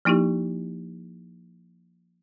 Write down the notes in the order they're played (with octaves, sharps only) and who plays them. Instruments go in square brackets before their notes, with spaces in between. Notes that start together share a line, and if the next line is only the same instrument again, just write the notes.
[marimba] F3 A#3 D#4 E4 G4